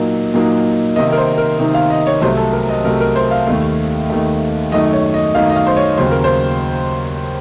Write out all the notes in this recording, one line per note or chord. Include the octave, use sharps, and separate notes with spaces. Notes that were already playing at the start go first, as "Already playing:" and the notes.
Already playing: A#2 F#3 A#3 D#4
A#2 F#3 A#3 D#4
C3 D#3 A#3 D#4 D#5
A#4
C5
A#4
C3 D#3 A#3 D#4
F5
D#5
C#5
C2 C3 F#3 A3 C5
A4
A#4
D#5
C2 C3 F#3 A3 A#4
A#4
C5
F5
D#2 D#3 A3
D#2 D#3 A3
F#2 D#3 A3 D#4 D#5
C#5
D#5
F#2 D#3 A3 D#4 F5
D#5
F5
C5
C#5
D#2 C#3 F#3 C5
A#4
C5